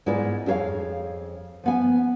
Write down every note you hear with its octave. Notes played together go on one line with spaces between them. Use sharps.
G#2 G#3 B3 E4 F4 D5
F2 D4 G#4 C#5 F5
F3 B3 G#5